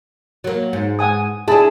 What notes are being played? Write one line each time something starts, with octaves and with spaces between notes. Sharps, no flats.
F#3 A#3
G#2
F#5 G#5 D#6
D4 E4 G#4 A5